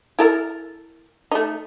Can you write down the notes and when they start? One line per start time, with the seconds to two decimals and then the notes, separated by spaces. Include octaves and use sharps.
0.19 E4 A4 A#4
1.31 A3 D#4